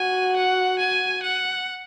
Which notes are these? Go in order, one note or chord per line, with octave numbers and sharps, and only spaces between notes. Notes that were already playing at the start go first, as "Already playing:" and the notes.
Already playing: F#4 G#5
F#5
G#5
F#5